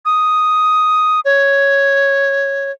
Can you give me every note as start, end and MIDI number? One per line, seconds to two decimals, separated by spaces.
0.05 1.20 87
1.25 2.71 73